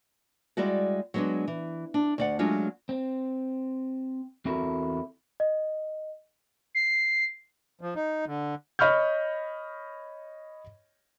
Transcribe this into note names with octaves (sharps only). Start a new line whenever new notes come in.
G3 G#3 E4 F#4 D5
F#3 G#3 B3 C#4 D4
E3
D4
D2 D5 F#5
F#3 G#3 A3 C#4 D4 F4
C4
E2 C4 E4 F#4 A4 A#4
D#5
C7
F3
D#4
D3
C#5 D#5 B5 C#6 F6 G6